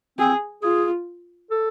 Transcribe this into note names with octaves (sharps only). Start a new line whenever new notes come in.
C4 G#4
F4 G#4
A4